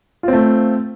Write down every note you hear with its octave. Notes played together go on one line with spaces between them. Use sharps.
A3 C4 F4